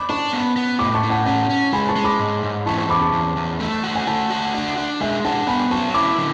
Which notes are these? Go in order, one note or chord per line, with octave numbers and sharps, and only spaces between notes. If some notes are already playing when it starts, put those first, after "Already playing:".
Already playing: B5 D6
D4 A5 C#6
B3
B3
A2 B5 D6
A5 C#6
A2
F#5 A5
C#4 F#5 A5
C#4
G#3 G#5 B5
A5 C#6
G#3
B5 D6
G#2
G#2
E3 A5 C#6
A5 C#6
E2 B5 D6
A5 C#6
E2
E2
A3
F#4
G#5
A3 F#5 A5
F#4
D4
D4
G#3 E5 G#5
D4 F#5 A5
B3 G#5 B5
F#3 A5 C#6
E4 B5 D6
D3